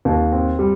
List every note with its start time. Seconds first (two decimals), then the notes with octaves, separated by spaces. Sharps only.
0.05 D#2
0.32 C4
0.59 G3